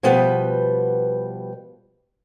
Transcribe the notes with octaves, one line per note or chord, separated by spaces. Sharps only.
B2 F3 G3 B3 B4 G5